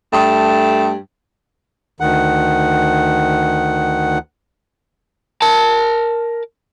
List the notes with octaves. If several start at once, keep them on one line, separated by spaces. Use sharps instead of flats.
G2 A3
D2 D#3 F#5
A#4 A5